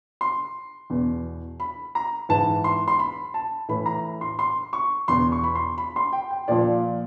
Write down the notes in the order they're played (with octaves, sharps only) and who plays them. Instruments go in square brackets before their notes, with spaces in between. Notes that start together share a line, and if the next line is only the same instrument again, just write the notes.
[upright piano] C6
E2 B2
B5
A#5
G#2 E3 A5
C6
C6
B5
A5
A2 E3 B5
A#5
C6
C6
C#6
E2 B2 C6
C#6
B5
C6
B5
C6
G5
G5
A#2 F3 D5